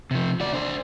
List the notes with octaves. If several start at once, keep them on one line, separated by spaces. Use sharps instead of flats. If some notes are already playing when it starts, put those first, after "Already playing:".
C3 F3
F#4 D5
D4 C5